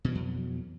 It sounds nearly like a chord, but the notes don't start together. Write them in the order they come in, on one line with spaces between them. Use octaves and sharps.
B2 E3 F#3 F2